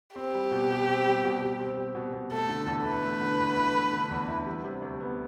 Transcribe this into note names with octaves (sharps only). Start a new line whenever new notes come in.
C4 G4
G3
B2
B2
C4
G3
B2
B2
C4
G3
B2
B2
A3 A4
D3
E2
E4 B4
A3
D3
E2
E4
A3
D3
E2
E4
G3
C3
D2
B3